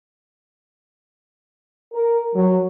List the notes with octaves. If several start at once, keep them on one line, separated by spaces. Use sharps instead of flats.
A#4
F#3